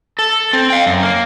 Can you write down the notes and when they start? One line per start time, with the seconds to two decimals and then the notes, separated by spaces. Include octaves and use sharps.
0.19 A4
0.53 C4
0.70 F5 G5
0.86 F#2
1.03 A#3